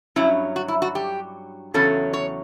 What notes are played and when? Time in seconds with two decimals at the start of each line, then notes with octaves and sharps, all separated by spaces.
0.16 G2 F#3 C#4 E4
0.56 F#4
0.68 E4
0.82 F#4
0.95 G4
1.74 E2 C#3 F#3 C#4 A4
2.13 C#5